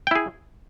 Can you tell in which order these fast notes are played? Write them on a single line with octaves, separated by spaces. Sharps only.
G5 E4 G#4